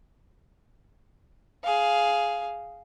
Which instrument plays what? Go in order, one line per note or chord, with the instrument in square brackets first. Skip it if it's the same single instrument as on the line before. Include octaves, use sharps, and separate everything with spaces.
[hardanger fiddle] G#4 F5